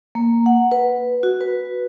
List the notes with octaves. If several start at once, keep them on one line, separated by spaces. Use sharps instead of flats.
A#3
F#5
B4
F#4
B4